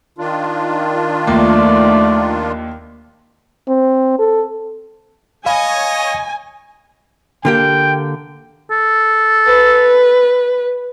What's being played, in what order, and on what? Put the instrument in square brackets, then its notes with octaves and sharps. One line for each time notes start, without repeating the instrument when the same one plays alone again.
[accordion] D#3 D4 F4
[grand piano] D#2 F3 A#3 [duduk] A3 [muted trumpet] D5
[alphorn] C4
A4
[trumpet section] C#5 D#5 [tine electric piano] F5 B5 [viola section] G#5
[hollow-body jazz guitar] D3 A#3 G4 [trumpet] G5
[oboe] A4
[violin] B4